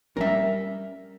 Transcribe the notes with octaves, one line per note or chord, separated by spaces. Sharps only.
G3 A3 C#4 A#4 E5